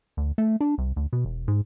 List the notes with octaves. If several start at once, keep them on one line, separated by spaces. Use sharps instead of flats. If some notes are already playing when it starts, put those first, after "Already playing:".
D2
A3
D4
C2
D2
B2
E1
G#2